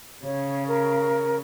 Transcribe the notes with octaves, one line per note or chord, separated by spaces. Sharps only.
C#3 C#5
A#4